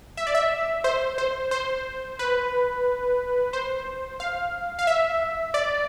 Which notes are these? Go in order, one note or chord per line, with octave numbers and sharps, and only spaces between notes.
E5
D5
E5
C5
C5
C5
B4
C5
F5
F5
E5
D5